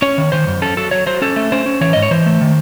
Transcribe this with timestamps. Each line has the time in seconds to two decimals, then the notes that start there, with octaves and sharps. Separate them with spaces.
0.02 C#4 C#5
0.18 D#3
0.32 D#3 C5
0.47 F#2
0.62 C#4 A4
0.77 F#3 A4
0.91 F#3 C#5
1.06 F#3 C5
1.22 C#4 A4
1.36 A3
1.52 C#4 C5
1.66 C#4
1.81 E3 C#5
1.93 G#2 D#5
2.02 C#5
2.11 E3 C5
2.26 A3
2.42 D#3